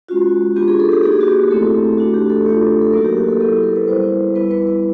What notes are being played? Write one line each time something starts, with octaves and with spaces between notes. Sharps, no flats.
G#3 C#4 F4 F#4
B3 D4 F4 G4
G#4
A4
G4
A#3 D#4 F#4 G#4
G4
F#4
G4
A3 C4 E4 A4
A3 D4 F#4
G4
A4
A3 D4 F4 A4
A4
F#3 A#3 D#4 F#4 A#4
G4
G4
A4
F#3 B3 E4 A4
A#4
B4
G3 B3 E4 C5
G3 B3 E4 B4
B4
B4